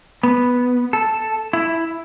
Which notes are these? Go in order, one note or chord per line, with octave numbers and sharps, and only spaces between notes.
B3
A4
E4